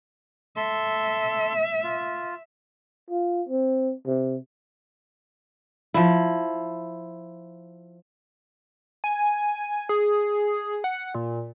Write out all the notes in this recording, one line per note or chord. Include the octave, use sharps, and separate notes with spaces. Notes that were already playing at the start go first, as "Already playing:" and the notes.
A4 E5 C6
F4
F4
C4
C3
F3 E4
G#5
G#4
F#5
A#2